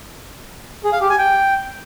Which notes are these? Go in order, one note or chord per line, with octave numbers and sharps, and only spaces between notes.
G#4
F5
G4
G#5
G5